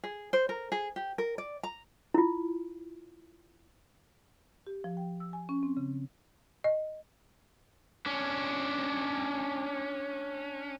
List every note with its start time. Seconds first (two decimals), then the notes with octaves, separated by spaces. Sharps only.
0.04 G#4
0.33 C5
0.49 A#4
0.72 G#4
0.96 G4
1.18 A#4
1.38 D5
1.63 A#5
2.14 E4 F4
4.67 G4
4.84 F3
4.97 G5
5.20 E6
5.33 G#5
5.49 C#4
5.63 C4
5.77 C#3
6.64 D#5
8.06 C#4 D4